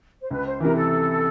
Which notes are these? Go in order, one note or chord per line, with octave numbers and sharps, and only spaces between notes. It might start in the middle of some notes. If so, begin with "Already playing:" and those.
C5
C#2 B4
C5
C3 E3 A#4
A4